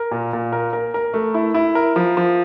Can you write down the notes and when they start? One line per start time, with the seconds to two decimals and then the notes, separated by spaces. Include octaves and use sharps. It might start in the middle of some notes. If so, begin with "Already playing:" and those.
Already playing: A#4
0.11 A#2
0.33 A#2
0.53 A#4
0.73 A#4
0.94 A#4
1.14 A3
1.34 E4
1.54 E4
1.75 A#4
1.96 F3
2.17 F3